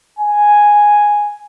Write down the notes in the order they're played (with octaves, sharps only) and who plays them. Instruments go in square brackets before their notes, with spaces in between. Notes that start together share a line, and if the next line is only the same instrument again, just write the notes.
[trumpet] G#5